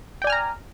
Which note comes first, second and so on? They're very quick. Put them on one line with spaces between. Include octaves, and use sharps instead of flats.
G5 D5 G#5 F6 A#5